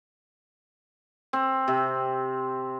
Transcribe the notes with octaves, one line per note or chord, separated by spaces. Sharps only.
C4
C3